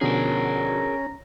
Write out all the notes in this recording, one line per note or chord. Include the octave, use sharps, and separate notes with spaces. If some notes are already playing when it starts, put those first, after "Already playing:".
B2 D3 F3 C#4 G#4 A#4 A#5